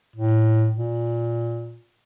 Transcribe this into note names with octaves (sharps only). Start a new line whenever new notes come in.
A2
A#2